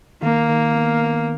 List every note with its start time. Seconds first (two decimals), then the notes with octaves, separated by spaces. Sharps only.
0.23 D#3 A#3
0.49 D#3
0.76 B3
1.03 B3